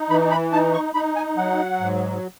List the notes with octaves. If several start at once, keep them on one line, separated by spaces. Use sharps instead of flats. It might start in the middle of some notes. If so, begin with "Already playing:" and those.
Already playing: D#4
E3 B5
B5
D#4 A5
C#6
D#4 B5
G#5
F#3 F#5
G#2